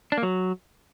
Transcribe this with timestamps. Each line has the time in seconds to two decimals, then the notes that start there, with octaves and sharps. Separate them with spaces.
0.12 D4
0.18 A#3
0.23 F#3